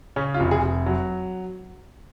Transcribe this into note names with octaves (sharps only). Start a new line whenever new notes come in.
C#3 C#4
F4
F1
G#4
F1
F#3